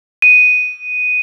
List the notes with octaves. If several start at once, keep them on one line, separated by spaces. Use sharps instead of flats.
D#7